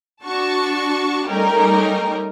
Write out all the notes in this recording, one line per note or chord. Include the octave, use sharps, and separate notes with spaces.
D4 F#4 A5 C#6
G3 A3 C#4 D#4 G4 A#4